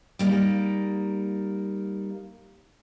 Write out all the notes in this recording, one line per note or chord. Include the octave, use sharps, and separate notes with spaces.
G3 A#3 D#4